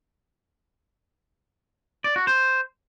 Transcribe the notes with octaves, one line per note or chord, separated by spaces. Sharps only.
D5
F#4
C5